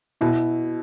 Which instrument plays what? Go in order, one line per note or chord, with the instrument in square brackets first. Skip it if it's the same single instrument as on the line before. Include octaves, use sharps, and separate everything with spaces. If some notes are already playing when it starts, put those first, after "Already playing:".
[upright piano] B2 [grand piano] E4